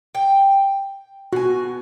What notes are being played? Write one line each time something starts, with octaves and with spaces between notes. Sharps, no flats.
G5
B2 F#4 G#5